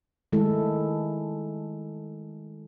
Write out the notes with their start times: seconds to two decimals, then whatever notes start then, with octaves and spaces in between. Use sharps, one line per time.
0.32 D#3 G#3 A3 E4 A4